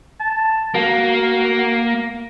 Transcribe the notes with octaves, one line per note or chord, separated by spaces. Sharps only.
A5
A#3 F#4